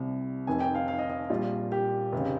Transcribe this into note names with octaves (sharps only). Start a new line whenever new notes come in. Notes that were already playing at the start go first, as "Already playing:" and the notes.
Already playing: C2 C3 G3
F1 F2 D#3 G#5
G5
F5
F5
D#5
D#5
A#1 A#2 G3 F4
G4
F1 C#3